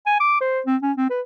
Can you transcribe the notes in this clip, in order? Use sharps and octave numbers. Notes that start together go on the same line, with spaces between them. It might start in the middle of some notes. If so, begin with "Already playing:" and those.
G#5
D6
C5
C4
C#4
C4
B4